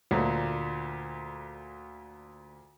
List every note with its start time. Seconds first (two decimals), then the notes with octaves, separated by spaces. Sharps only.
0.11 D2 A#2 A3